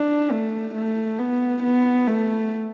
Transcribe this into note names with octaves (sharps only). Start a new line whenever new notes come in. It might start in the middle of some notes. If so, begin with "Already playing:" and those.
Already playing: D4
A3
A3
B3
B3
A3